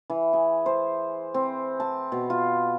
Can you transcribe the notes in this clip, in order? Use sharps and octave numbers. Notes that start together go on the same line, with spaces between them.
E3
G#4
C5
C4
A5
B2
F4